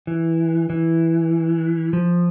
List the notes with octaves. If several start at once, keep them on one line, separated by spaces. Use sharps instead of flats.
E3
E3
F3